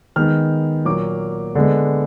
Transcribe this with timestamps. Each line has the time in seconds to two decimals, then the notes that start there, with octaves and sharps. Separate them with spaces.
0.16 D#3 G#3 B3 F6
0.85 A#2 F#3 A#3 D6
1.55 D3 G#3 B3